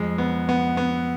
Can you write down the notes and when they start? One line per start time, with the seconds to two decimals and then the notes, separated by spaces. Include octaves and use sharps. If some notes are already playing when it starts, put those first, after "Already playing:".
Already playing: F2 G#3
0.18 B3
0.49 B3
0.77 B3